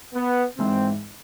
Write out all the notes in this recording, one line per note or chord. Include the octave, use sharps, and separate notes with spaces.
B3
G#1 G#2 E3 C4